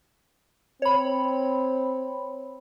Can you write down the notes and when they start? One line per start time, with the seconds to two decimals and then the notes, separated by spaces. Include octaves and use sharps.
0.82 C4 C#5 B5